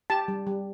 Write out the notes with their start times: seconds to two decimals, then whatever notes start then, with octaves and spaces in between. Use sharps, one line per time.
0.10 G4 A5
0.28 G3
0.47 G3